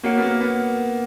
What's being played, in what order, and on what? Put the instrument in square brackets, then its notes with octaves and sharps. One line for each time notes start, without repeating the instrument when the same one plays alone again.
[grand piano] A#3 [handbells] F#4 A#4 C#5 F#5
[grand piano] B3
A#3
B3